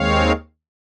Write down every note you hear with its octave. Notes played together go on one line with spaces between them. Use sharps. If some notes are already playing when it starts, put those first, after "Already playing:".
Already playing: D#2 D#3 G#3 C4 C#5 F5